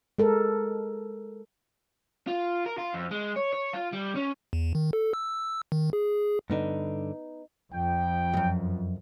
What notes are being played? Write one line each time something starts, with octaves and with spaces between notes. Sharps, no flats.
G#3 A4 A#4
F4
A#4
F4
F2
G#3
C#5
C#5
F4
G3
C#4
E2
D#3
A4
E6
D#3
G#4
G2 D3 B3 D#4
F2 G5
C#2 F#2